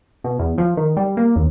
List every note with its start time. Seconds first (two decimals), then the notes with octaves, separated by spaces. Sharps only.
0.24 B2
0.39 E2
0.58 F3
0.77 D#3
0.97 G3
1.17 A#3
1.36 D#2